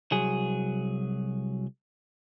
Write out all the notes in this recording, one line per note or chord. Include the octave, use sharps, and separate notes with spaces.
C2 F#3 G#4